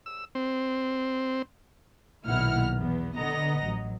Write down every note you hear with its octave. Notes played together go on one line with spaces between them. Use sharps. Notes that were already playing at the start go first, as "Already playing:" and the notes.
E6
C4
B1 A#2 D#3 E4 F#5 F6
E2 B3
D3 B3 D#5 F#5 A#5 A#6
A1 F#3